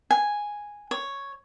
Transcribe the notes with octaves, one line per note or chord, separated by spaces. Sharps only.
G#5
C#5